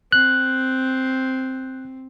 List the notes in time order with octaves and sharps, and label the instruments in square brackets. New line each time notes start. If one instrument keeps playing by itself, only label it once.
[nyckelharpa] C4 [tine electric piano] F#6